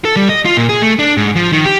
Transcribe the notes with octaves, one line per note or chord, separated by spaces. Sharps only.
A4
G3
D#5
F4
A#2
G#4
A3
D4
G#2
F3
D#3
G4